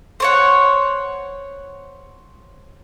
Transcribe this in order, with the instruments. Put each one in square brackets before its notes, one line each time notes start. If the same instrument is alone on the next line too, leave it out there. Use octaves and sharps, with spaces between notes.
[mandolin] C5 C#5 F#5